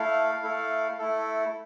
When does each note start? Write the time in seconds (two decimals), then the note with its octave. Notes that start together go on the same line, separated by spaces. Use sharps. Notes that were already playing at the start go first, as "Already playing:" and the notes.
Already playing: A3 E4 A4 F5
0.43 A3 E4 A4
0.99 A3 E4 A4